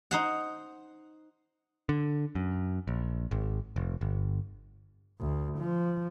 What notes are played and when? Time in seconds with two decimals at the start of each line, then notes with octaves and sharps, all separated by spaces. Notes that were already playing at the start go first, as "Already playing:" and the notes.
0.11 D#4 C5 F#5
1.89 D3
2.35 F#2
2.87 A#1
3.31 G#1
3.76 F1
4.01 G1
5.20 D2
5.59 F3